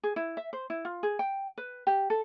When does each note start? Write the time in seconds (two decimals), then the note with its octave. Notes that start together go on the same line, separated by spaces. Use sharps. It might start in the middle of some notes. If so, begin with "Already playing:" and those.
0.03 G#4
0.16 E4
0.37 E5
0.53 C5
0.70 E4
0.85 F4
1.03 G#4
1.19 G5
1.58 B4
1.87 G4
2.10 A4